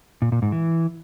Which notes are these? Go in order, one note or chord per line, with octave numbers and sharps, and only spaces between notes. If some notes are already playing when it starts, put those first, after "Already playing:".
A#2
A#2
G#2
E3